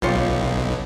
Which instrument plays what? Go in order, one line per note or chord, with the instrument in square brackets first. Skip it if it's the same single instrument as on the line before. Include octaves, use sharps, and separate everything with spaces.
[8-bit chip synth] B1 [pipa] C#4 F4 G4